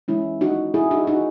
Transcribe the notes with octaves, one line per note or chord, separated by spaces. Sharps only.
E3 G#3 C#4 E4
D#4 F#4
E4 G#4
D#4 F#4
D#4 F#4